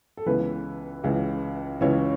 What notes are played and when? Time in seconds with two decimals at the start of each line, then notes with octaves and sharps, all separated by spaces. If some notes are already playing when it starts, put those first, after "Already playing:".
0.17 A4
0.26 C#2 C#3 E3 B3 B4
1.04 C#2 C#3 E3
1.81 C#2 C#3 E3 C#4 C#5